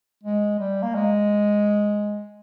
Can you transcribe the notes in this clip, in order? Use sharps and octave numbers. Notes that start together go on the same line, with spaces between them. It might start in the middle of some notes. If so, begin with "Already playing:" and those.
G#3
G3
A#3
G#3